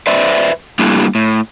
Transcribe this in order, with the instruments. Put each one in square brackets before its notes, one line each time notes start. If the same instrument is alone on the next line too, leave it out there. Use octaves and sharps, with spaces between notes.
[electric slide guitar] B4 C5 D5 E5
G3 A3 A#3 D4 E4 G4
A2